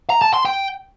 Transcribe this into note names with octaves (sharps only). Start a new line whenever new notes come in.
A#5
A5
C6
G5